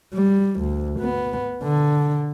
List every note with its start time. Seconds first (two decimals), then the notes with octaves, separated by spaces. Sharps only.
0.14 G3
0.60 D2
1.00 B3
1.63 D3